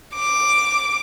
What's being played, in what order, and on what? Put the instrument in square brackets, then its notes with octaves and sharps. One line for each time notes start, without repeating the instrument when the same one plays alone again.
[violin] D6